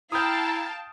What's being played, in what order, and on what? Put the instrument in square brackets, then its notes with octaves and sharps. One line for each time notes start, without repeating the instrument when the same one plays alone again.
[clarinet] E4 [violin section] F5 G5 A5 [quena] A#5 [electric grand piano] D#6 G6